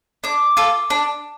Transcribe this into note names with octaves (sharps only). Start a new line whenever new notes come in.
D4 D6
F4 A4
D4